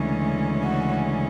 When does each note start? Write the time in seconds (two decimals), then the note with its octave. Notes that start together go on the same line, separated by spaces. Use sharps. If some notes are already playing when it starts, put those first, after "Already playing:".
Already playing: D2 C#3 E3 G#3 C#4
0.62 F#4